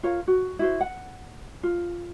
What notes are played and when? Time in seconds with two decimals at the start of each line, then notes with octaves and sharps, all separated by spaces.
0.03 F4 A#4 C#5 F5
0.28 F#4
0.59 E4 F#4 C5
0.81 F#5
1.63 F4